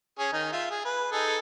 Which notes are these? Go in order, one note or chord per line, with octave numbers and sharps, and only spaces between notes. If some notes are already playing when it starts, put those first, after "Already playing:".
C#4 G#4
D#3 D#4
F4 E5
G#4
B4
D#4 G#4 A4